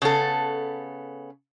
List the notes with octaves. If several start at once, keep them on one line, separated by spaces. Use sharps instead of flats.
C#3 B3 A4